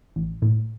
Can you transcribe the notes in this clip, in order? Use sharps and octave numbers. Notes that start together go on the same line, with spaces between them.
A1
A2